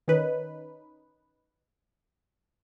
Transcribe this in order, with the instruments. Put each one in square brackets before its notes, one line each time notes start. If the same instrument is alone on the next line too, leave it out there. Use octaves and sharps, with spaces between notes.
[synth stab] D#3 C#4 D#4 B4